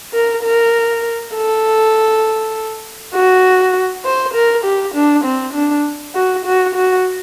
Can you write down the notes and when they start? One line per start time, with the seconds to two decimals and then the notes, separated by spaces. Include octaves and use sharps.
0.14 A#4
0.44 A#4
1.35 A4
3.14 F#4
4.05 C5
4.34 A#4
4.65 G4
4.95 D4
5.25 C4
5.54 D4
6.15 F#4
6.46 F#4
6.75 F#4